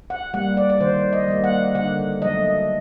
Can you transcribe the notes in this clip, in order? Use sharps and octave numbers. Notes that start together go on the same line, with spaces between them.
F#5
G3 A#3 F#5
D5
D5
D#3 C5
D#5
G3 A#3
F#5
D3 F#5
F#3 A3 D#5